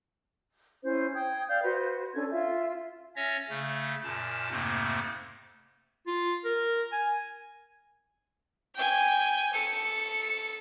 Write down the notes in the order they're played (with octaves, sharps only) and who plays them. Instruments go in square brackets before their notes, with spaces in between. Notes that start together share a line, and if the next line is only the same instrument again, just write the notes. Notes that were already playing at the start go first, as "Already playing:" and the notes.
[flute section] C#4 E4 C5
G5 D#6 G#6
D5 F5 G6
F#4 B4 C5
C#4 D4 A4 G#6
F4 E5
[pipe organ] C#4 C#5 E5 A6 A#6
C#3 A3
F#2 A#2 A5
F2 G#2 C3 A3 A#3
[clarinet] F4
A#4
G#5
[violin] G5 G#5
A4 C#7